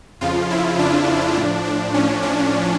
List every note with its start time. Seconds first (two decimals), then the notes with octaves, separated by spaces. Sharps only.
0.21 F2 C#3 F3 F4
0.50 E4
0.79 D4
1.37 A2 F3
1.65 D4
1.94 C#4
2.23 D4